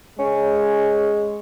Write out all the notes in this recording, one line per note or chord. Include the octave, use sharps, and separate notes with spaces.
G#3 C#4